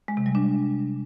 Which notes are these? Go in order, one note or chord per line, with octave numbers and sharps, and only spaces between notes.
G#3
C3
G3
D4